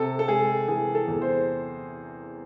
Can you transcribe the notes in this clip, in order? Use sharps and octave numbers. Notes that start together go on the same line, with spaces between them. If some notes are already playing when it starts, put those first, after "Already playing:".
Already playing: C3 A4
A4
G#3 G#4
E3 G#4
A4
E2
C5